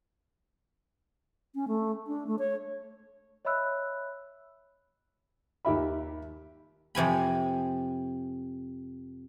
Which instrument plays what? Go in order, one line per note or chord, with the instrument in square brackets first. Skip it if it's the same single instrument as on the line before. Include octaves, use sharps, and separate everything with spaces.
[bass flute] C#4
A3
D4
A3
C#5
[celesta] C#5 D#5 E5 B5 E6 F#6
[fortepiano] D#2 G4 E5 B5
[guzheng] F2 C3 G#5 B5